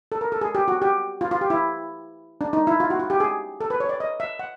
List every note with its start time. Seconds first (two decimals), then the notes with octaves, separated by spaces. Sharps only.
0.12 A4
0.21 A#4
0.32 A4
0.41 G#4
0.55 G4
0.68 F#4
0.82 G4
1.21 F4
1.31 F4
1.41 G4
1.50 E4
2.41 D4
2.53 D#4
2.67 E4
2.80 F4
2.90 F#4
3.00 F4
3.10 G4
3.20 G#4
3.61 A4
3.70 B4
3.80 C#5
3.89 D5
4.00 D#5
4.20 E5
4.39 F#5